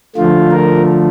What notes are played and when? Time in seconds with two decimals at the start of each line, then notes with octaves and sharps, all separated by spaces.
0.16 D3 F3 A3 F4
0.51 A#4